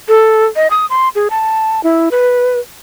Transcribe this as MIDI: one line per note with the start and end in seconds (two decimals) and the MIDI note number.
0.08 0.44 69
0.56 0.67 75
0.70 0.86 87
0.90 1.09 84
1.15 1.28 68
1.30 1.83 81
1.83 2.09 64
2.11 2.59 71